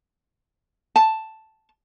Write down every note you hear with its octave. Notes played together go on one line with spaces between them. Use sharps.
A5